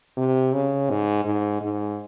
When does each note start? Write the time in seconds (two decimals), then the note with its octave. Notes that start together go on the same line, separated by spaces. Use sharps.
0.17 C3
0.53 C#3
0.90 G#2
1.25 G#2
1.61 G#2